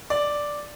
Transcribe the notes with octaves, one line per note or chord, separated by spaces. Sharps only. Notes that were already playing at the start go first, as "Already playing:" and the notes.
D5